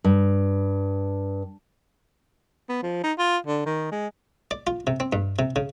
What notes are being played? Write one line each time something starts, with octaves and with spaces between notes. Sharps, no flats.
G2
B3
F3
D#4
F4
D3
D#3
G#3
D5
F4
C3
C4
G2
C3
C#3